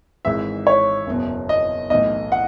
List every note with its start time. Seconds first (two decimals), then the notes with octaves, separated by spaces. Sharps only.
0.25 G#1 G#2 E3 G#3 E5
0.67 C#5
1.07 F#1 E2 B2
1.49 D#5
1.90 B1 A2 E3 D#5
2.32 F#5